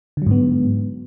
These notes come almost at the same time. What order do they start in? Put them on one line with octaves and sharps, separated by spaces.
D3 F#3 G#2 B3